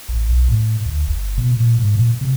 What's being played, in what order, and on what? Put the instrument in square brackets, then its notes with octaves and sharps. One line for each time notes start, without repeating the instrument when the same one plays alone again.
[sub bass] A1
B1
A2
D2
G1
B2
A#2
G#2
A#2
C3